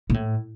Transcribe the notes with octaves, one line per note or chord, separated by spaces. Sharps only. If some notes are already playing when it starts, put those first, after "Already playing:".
A#2
A2